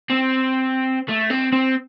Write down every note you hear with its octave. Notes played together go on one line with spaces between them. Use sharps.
C4
A3
C4
C4